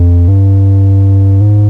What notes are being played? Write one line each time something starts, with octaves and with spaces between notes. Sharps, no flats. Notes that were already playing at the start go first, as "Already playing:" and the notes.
Already playing: F2
G2
G#2